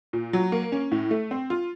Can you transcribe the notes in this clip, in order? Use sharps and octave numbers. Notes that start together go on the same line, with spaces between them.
A#2
F#3
A#3
C#4
A2
A3
C4
F4